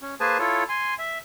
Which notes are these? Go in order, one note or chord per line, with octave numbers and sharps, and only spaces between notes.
C#4
A#3 G#4 B4 C5 G#5 A5
E4 F4 A4 C#5
G#5 C6
E5